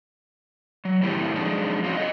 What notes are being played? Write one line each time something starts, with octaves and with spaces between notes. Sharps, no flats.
F#3
A2 D#3 A3 C4 E4 G4
F3 F#3 G#3 C4 D4 D#4
C4 D#4 F4 F#4 C#5
A4 D#5